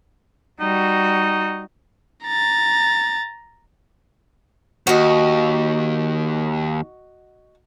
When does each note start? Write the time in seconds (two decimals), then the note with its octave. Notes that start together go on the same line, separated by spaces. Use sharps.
0.61 G3 D#4 F#4
2.26 A#5 A6
4.87 D#2 F#4 D#5